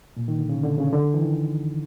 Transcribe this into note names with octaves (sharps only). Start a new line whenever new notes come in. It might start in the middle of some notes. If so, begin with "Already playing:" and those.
A#2
D#3
D3
C#3
D3
C#3
D3
E3
D#3